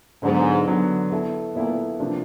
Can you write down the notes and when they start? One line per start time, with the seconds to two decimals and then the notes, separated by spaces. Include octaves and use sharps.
0.23 G#2 D3 F#3 B3
0.67 D3 F#3 B3
1.11 B3 E4 A4
1.55 A#2 B3 E4 A4
2.00 C3 F3 A#3 D4